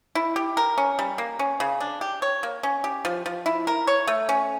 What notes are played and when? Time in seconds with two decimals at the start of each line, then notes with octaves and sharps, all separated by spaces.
0.15 E4
0.36 G4
0.57 A#4
0.78 C#4
0.99 G3
1.18 A#3
1.39 C#4
1.60 C#3
1.80 D4
2.01 G4
2.22 C#5
2.43 A#3
2.63 C#4
2.84 G4
3.05 F3
3.26 F3
3.46 E4
3.67 A#4
3.87 C#5
4.07 A3
4.29 C#4